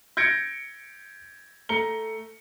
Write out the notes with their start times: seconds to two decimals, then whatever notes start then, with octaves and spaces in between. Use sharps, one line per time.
0.17 G6 G#6 A#6 C#7 D7
1.69 A3 A#5 C#7 G7